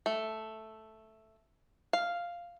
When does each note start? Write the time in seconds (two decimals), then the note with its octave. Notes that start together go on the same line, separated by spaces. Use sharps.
0.06 A3
1.93 F5